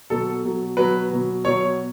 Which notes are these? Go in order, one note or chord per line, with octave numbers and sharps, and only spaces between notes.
B2 F#3 A4
B2 F#3
B2 F#3 B4
B2 F#3
B2 F#3 C#5